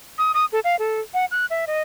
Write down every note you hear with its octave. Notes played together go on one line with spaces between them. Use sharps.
D#6
D#6
A4
F5
A4
F#5
F#6
E5
D#5